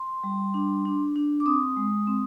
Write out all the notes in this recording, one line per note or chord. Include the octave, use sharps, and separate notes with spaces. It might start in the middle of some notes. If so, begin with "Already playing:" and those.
Already playing: C6
G3
D4
D4
D4
D6
C4 D#6
G#3
C4